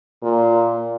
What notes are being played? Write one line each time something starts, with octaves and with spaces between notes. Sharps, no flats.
A#2